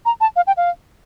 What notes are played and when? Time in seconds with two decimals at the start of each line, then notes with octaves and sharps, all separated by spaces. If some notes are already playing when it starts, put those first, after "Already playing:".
0.06 A#5
0.21 A5
0.36 F5
0.47 G5
0.57 F5